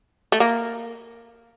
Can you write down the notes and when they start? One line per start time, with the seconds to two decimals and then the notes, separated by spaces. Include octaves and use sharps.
0.32 A3
0.40 A#3